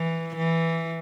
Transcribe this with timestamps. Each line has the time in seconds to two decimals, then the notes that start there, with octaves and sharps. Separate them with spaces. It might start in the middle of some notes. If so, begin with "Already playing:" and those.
Already playing: E3
0.36 E3